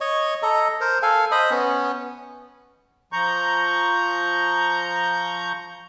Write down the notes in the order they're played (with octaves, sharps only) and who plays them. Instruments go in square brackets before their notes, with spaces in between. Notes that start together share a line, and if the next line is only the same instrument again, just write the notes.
[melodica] C#5 D#5 C#6
A4 D#5 A#5
A#4 C5
A4 F5 G#5
C5 D#5 B5 D#6
B3 C#4
[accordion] F3 A#5 C#6 G6